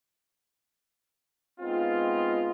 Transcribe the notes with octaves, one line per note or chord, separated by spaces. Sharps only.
G#3 B3 C4 D#4 F4